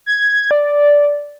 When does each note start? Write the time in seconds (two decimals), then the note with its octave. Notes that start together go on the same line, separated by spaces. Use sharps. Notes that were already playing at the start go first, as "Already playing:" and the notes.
0.06 G#6
0.51 D5